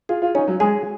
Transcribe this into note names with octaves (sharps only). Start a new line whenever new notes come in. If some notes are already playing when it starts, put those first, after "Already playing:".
F4 G#4
F4
C#4 D#4
F#3
G#3 G#4